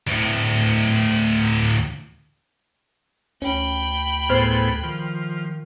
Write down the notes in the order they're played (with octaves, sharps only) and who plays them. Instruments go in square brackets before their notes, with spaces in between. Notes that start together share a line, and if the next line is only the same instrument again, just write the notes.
[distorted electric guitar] D2 A2
[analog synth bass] D2 [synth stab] C#4 [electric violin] G5 B5
[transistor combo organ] A2 B3 G#4 [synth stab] C5 F6 C7
[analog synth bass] D#3 [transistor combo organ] F3